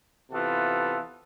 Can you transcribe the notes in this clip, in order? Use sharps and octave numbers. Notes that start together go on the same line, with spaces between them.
C3 E3 B3 F4 A4